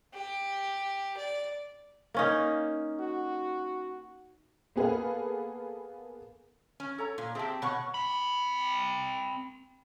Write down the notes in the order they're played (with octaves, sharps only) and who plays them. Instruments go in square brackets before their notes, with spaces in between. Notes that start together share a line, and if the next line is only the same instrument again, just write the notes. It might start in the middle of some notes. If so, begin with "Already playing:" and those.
[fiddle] G4
D5
[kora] A#3 C#4 D#4
[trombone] F#4
[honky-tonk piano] A#3 B3 G#4 A4 B4 F5
[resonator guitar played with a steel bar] C#4
[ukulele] A4 C#5 A#5
[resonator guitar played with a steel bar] A#2
[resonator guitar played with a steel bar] C4 G4 [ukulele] G#4 E5 A5
[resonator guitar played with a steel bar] B2 C#5 F#5
[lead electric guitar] C4 B5